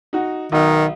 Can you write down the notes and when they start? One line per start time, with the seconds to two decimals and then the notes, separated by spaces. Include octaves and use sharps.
0.13 D#4 F#4
0.52 B1 D#3